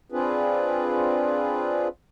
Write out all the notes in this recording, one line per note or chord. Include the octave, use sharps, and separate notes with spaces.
C4 D4 F4 G#4 B4